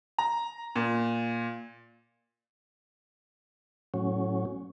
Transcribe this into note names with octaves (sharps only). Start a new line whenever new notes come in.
A#5
A#2
A2 F#3 C#4